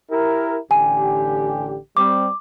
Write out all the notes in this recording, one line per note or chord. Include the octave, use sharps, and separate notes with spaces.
E4 G4 A#4
A1 D3 G4 G#5
G3 C4 D6